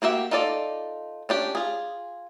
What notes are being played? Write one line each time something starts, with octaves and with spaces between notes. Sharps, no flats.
A#3 F#4 G4 E5
D#4 F4 A4 D5
C#4 D4 G4
F4 G#4